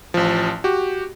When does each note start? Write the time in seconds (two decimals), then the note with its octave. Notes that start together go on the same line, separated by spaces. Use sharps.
0.14 A1 F3
0.64 F#4 G4